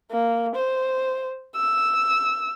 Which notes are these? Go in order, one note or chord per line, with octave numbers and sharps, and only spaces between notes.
A#3
C5
E6